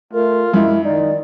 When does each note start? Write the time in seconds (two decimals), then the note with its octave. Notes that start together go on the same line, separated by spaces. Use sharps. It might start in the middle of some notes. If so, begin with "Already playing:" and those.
0.13 A3 F4 A#4
0.54 F#2 G#3 E4
0.84 D#3 D#4 D5